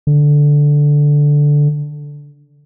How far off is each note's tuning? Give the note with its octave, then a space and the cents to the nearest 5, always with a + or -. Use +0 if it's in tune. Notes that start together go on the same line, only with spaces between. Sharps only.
D3 -5